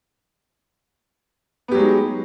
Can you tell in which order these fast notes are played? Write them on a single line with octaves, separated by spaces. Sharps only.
B3 G4 F#3 G#3 D#4